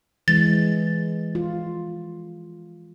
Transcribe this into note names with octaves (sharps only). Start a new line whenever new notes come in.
E3 G#3 A6
F4